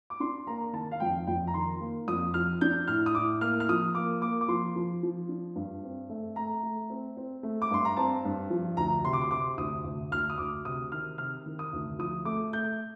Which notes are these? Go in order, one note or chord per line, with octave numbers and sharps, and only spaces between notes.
D6
D4 C6
A#3 A#5
D#3 A5
F5
F2 G5
F2 G5
A#5
D#3 C6
A#3
F2 D#6
F3 F6
D4 G6
A2 F6
D#6
A2 D6
A#3 F6
F6
F3 D#6
A#3 D6
A#3 D6
D6
F3 C6
F3
F3
D4
G2
C4
A3
A3 A#5
A3
C4
C4
A3
D6
G2 C6
A#5
C4 A5
G2
F3
D2 A#5
C3 C6
D6
C6
C3 D6
D2 D#6
D2
D2 F6
D#6
D2 D6
C3 D#6
D#3 F6
C3 F6
D#3
D#6
D2
F3 D#6
A3 D6
A3 G6